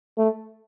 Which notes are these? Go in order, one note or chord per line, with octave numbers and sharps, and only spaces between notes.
A3